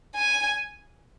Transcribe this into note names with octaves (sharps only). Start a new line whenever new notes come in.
G#5